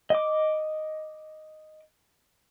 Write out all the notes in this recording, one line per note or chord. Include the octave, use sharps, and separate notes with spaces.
D#5 D6